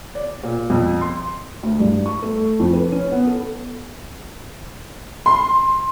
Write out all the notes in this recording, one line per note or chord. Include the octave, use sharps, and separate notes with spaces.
D5
A#2
F2
C6
D2
G2
C#6
A3
F2
B4
C#4
B3
A4
C6